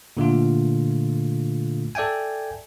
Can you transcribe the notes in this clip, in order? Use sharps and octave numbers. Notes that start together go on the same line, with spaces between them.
A#2 D3 A3 F4
A4 D5 E5 G5 G#5